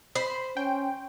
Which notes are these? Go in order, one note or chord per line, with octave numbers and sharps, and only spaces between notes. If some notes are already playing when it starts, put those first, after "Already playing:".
C5 B5
C#4 G5